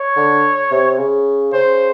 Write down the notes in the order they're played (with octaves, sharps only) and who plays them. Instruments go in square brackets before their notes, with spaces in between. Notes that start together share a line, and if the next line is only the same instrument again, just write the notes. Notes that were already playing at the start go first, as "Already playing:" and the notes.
Already playing: [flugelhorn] C#5
[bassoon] D3
C3
C#3
[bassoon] C#3 [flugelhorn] C5